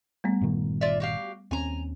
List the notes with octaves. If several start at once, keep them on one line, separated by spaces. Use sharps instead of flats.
G3 A3 B3
G1 A#2 D#3
F4 D5 E5
F#4 G4 F5
D#2 C4 C#4 G#5 A#5